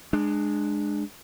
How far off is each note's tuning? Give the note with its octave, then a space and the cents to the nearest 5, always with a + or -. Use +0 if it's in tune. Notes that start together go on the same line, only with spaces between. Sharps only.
G#3 +0 D4 +20